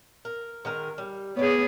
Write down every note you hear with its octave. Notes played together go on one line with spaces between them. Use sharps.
A#4
D#3 G#3 A#4
G3
B3 G#4 C#5 D5